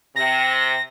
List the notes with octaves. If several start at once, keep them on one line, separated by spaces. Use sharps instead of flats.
C3 A#6